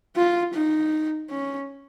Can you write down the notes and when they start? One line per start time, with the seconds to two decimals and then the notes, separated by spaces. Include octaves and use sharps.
0.16 F4
0.54 D#4
1.30 C#4